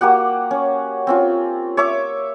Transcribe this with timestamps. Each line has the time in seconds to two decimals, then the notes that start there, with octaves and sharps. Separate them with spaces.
0.01 A#3 F#4 G4 F#5
0.51 C#4
1.07 C4 C#4 F4
1.77 C#5 E5 C#6 D6